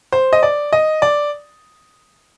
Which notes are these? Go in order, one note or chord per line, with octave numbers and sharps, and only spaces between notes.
C5
D#5
D5
D#5
D5